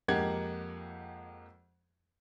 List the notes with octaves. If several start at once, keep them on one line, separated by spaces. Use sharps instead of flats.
F2 G#3 A#3 G4 F#5 G#6